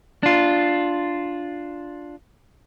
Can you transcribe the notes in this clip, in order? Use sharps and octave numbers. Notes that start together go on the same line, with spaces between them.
D4 F4